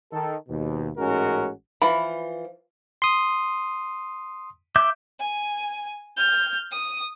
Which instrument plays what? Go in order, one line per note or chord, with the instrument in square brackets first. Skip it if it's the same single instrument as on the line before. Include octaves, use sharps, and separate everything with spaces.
[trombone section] D#3 A4
D#2 B2
A1 G#2 G#3 C#4 F#4 A#4
[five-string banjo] E3 F3 B5
[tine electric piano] C6 D#6
[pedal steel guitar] E5 D6 G6
[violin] G#5
F6 G6
D#6